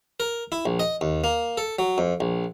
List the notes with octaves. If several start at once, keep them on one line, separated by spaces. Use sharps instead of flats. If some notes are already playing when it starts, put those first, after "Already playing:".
A#4
E4
A#1
D#5
D#2
A#3
A4
F#3
F2
A#1